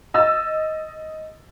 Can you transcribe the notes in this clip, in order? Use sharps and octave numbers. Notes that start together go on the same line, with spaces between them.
D#5 E6 A6